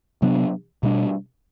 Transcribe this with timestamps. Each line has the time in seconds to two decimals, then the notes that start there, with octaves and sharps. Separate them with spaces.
0.22 C3 F#3 B3 D4
0.83 B2 G3 D4